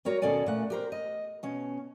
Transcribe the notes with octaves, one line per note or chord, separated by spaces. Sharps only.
G3 F#4 A#4 C#5
D#2 B2 C#4 A4 D5 G#5
A#2 A3 F#5
G4 A#4 C5
D#5
B2 C#4